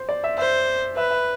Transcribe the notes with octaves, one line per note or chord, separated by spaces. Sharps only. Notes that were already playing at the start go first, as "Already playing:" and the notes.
Already playing: C5
D5
E5
C5 E5
B4 E5
E5